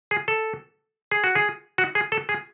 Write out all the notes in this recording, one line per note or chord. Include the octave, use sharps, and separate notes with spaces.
G#4
A4
G#4
F#4
G#4
F#4
G#4
A4
G#4